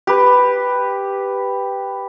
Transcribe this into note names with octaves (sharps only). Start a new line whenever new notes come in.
G4 B4